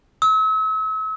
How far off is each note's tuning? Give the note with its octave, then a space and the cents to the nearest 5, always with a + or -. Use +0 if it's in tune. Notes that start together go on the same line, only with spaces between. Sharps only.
E6 -40